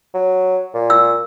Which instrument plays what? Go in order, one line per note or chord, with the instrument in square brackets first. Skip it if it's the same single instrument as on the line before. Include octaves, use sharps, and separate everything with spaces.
[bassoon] F#3
A#2
[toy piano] E6